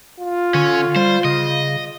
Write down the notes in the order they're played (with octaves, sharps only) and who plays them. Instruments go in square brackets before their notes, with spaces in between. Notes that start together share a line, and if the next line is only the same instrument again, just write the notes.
[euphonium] F4
[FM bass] D3 [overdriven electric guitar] C#4
[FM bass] G3 [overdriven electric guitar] C5
[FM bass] C#3 [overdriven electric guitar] D#5